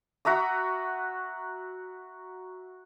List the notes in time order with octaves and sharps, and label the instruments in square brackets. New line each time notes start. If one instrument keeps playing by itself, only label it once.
[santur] F#4 E5 A#5 D#6